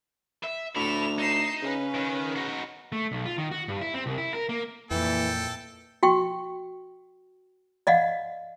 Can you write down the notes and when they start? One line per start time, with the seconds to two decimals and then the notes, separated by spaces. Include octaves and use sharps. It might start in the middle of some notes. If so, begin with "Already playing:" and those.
0.44 E5
0.75 D2 E4 A4 E7 F7
1.18 D#4 C7 E7
1.62 C#3 C#4 B4
1.95 D#3
2.36 D#4 F#4
2.92 A3
3.12 B1
3.25 F4
3.38 D#3
3.51 F#4
3.68 G2
3.81 E4
3.94 C4
4.06 C2
4.18 E4
4.34 A#4
4.49 A#3
4.91 F2 A#2 E3 A4 G5
6.03 F#4 G5 C#6
7.87 D5 D#5 F5 F#5